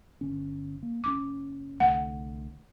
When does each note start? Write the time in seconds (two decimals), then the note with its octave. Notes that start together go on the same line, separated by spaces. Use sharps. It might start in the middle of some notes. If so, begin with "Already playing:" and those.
0.21 G1 D3 C#4
0.83 A#3
1.04 F#1 C4 C#4 D6
1.80 C2 D3 A3 F#5